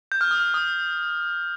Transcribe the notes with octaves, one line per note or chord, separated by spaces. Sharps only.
G6
F6
D#6
F6
D#6